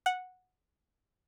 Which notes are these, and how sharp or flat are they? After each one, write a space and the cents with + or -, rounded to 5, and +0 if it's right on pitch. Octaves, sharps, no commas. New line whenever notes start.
F#5 -10